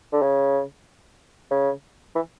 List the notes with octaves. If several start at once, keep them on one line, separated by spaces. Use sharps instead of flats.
D3
C#3
C#3
E3